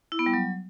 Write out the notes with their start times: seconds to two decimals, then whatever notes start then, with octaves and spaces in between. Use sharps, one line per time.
0.12 E4
0.19 B3
0.26 G3
0.34 F#3